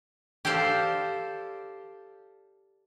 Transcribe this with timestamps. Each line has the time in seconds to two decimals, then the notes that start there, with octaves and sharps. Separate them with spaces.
0.45 G4 A4 C5 D5 F5